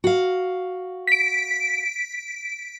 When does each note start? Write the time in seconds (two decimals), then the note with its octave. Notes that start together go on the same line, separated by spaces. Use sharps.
0.04 F#4 F5
1.07 B6 D7